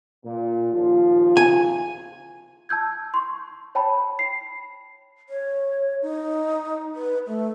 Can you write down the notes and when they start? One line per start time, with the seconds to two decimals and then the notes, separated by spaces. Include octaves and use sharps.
0.25 A#2
0.73 D#2 F3 F4
1.37 G#5
2.69 A5 E6 G6 G#6
3.14 C6 C#6
3.75 C#5 G5 A5 B5
4.19 C7
5.29 C#5
6.02 D#4
6.96 B4
7.27 A3